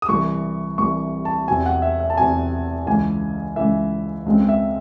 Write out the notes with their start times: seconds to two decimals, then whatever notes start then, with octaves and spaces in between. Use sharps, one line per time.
0.02 D#6
0.09 C2 C3 E3 C#6
0.78 C2 C3 E3 C#6
1.25 A5
1.48 E2 C3 F#3 C4 G#5
1.66 F#5
1.82 E5
2.00 E5
2.10 A5
2.17 E2 C3 F#3 C4 G#5
2.86 C#2 C#3 E3 G#5
3.56 C#2 C#3 E3 E5
4.26 C#2 C#3 G#3 C4
4.49 E5